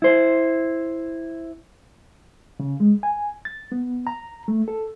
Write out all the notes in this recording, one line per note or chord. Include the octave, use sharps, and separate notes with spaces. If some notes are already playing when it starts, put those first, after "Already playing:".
E4 C5
C#3
G#3
G#5
A6
B3
A#5
A3
A4